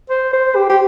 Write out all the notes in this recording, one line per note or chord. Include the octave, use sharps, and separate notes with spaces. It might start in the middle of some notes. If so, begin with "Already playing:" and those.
C5
C5
G4
G4